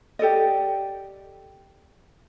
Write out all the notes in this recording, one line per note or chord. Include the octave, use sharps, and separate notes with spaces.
G4 A4 D5 D#5